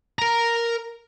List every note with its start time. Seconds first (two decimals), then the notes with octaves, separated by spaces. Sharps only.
0.19 A#4 A#5